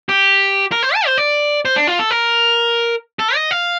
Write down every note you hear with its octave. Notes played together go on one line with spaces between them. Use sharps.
G4
A#4
C5
A5
C5
D5
C5
D4
F4
A4
A#4
A4
D#5
F5